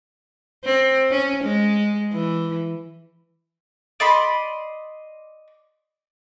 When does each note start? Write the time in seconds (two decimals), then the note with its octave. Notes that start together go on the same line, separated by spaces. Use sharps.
0.64 C4
1.11 C#4
1.44 G#3
2.12 E3
4.00 D5 D#5 B5 C6